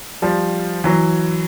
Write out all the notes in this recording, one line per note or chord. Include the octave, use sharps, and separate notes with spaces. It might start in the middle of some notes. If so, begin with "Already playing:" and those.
F3 G3
E3 F#3